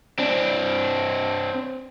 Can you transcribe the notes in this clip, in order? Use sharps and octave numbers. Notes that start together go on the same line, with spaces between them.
C4 D4